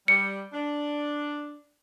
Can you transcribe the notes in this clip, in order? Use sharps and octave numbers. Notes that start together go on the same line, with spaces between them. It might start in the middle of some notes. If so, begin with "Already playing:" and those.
G3 C#7
D4